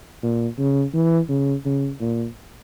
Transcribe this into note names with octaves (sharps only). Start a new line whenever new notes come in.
A#2
C#3
E3
C#3
C#3
A#2